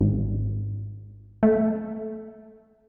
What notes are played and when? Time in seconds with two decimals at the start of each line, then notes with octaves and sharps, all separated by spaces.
0.01 G#1
1.43 A3